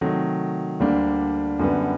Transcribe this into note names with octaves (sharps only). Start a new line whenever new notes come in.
C3 D#3 F#3 A3
D2 D3 G3 A#3 D4
F#2 D3 G3 B3